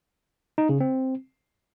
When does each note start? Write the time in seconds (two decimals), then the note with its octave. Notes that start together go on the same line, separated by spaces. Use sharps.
0.58 D#4
0.69 C#3
0.80 C4